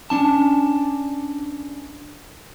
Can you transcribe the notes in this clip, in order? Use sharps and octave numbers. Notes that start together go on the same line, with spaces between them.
C#4 D4 A5